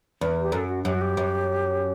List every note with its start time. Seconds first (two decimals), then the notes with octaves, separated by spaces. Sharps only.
0.21 E2
0.42 G4
0.52 F#2 A4
0.69 F#4
0.85 F#2 G4
0.95 F#4
1.01 G4
1.17 F#2